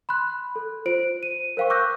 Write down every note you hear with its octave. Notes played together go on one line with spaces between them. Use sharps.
B5 C6 F#6
A4
F4 C5 D7
D#7
A#4 C5 F5 G5 C#6
C#6 D6 E6 F#6 G6 A#6